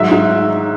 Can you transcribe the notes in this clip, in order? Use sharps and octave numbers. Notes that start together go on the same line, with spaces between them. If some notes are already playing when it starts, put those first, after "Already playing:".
Already playing: G#2 F#3 E5
G#2